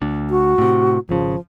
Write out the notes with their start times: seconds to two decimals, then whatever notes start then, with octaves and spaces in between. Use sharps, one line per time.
0.02 D2 D4
0.30 F#4
0.58 A2 C3
1.09 G#1 C#3 F3